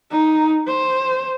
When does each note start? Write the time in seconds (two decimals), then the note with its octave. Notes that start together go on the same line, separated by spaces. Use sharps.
0.11 D#4
0.67 C5